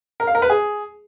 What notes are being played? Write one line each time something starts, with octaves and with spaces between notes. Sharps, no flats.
A#4
F5
A#4
B4
G#4